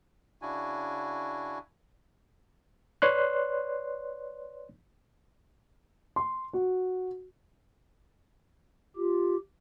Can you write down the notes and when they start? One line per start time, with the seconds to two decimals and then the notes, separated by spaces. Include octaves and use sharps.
0.42 C#3 D4 E4 F#4 G#5
3.02 B4 C#5 D5 C6 F#6
6.16 C6
6.53 F#4
8.96 F4 G4